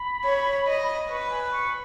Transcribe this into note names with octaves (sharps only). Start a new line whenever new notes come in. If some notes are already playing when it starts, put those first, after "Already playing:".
Already playing: B5
C#5
D#5
B4 C#6
B5
G#5
C#6